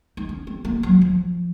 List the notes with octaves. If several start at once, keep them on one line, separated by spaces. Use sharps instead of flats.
D#4
C#4
C4
A#3
F#3
F3